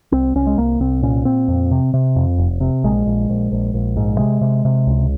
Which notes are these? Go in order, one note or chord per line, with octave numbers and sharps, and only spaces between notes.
C2 C4
C2 C#4
G#3
C2 A#3
C2 C4
A#2 C#4
A#2 C4
F2
C3
C3
F2
F1
C3
A#1 G#3
A#1
A#1
A#1
A#1
G#2
C3 G#3
C3
C3
C#2